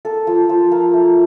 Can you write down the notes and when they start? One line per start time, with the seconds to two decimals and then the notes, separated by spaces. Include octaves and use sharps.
0.05 A#3 A4
0.27 F3
0.49 F3
0.72 A#3
0.93 A3